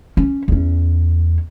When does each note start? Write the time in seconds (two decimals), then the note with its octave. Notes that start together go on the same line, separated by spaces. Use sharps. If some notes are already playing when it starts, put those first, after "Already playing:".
0.17 C#4
0.48 E2 C#4